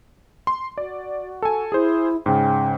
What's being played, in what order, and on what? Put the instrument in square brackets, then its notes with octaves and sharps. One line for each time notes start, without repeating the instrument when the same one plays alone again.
[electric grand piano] C6
[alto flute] F#4 [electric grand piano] D5
[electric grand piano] A4 G#5
[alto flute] E4 [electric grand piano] G#4 C5
[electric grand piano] G#2 C#3 [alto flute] G5